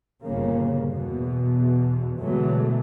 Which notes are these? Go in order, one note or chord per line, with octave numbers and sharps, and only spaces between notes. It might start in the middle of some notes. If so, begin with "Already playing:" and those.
G1 A#2 C#3 A#3
E2 B2
B2 D3 E3 F#3 G#3 A3